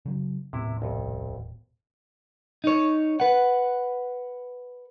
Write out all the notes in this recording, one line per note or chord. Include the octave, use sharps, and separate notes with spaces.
C#3 F#3
D#1 A2 C3 B3 E4
C2 F2
D#4 C#5
B4 F#5